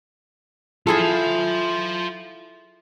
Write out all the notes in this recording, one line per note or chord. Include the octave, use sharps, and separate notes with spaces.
E4 F4 G#4 A4 A5